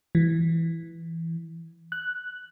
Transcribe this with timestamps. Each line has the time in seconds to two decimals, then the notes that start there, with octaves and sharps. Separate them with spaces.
0.15 E3
1.92 F#6